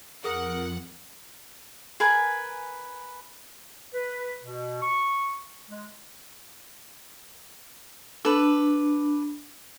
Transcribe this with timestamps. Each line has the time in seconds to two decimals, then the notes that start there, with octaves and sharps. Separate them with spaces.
0.24 F2 G#4 A#4 F#5 D#6
2.00 G#4 A#4 B4 G#5
3.93 B4
4.43 B2
4.82 C#6
5.68 G#3
8.25 D4 A4 B4